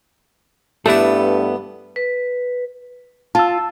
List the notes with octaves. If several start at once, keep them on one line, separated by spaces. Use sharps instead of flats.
G2 G3 A3 B3 D4 E4 A4 D5
B4
F4 A5 E6